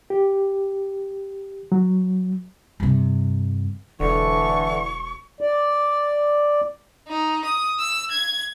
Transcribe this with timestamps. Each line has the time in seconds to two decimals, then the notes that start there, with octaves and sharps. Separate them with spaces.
0.10 G4
1.72 F#3
2.80 G2 C3
4.00 E1 D3 E3 C#6
5.41 D5
7.08 D#4
7.45 D#6
7.79 E6
8.11 G#6